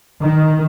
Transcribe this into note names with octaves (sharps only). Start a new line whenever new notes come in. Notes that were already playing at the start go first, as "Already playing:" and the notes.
D#3